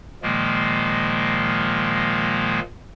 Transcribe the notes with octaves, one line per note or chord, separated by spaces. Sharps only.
A#2 D#3 F3 G#3 A#3